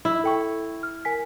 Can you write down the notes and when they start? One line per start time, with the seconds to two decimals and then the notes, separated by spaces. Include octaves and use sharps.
0.05 E4
0.24 A4 G5 C#6
0.83 F6
1.05 A#4 G#5 B6